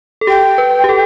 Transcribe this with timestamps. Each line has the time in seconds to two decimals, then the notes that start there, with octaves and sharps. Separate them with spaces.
0.21 A4
0.27 G4 G5
0.58 B4
0.84 G4
0.89 A4